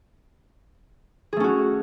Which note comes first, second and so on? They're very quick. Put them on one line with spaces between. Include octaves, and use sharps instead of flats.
G#4 A3 C#4 F#4